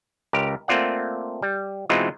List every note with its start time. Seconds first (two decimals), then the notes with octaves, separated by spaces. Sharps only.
0.33 C#2 G4 A#4
0.68 A3 A#3 C4 F4 D5 F#5
1.42 G3
1.89 B2 E3 G#3 C4 D#4 F4